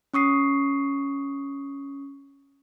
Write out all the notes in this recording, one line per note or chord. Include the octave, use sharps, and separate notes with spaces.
C#4 C#6 D#6 C7